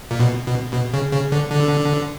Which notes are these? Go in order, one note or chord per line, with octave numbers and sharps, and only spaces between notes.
A#2
B2
B2
B2
C#3
C#3
D3
D3